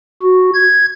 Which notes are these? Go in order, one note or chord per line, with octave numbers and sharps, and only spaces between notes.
F#4
G#6